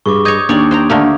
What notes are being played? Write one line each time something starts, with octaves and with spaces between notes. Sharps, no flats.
G2 G#4 C#6 D6
C#5 D#5 D#6 G6 G#6
D#2 D4 C#5 D5
C5 G5 A#5
D3 A3 A#3